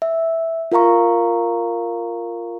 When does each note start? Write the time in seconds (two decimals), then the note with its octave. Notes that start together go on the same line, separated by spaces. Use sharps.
0.02 E5
0.72 F4 A#4 F5 A#5 C#6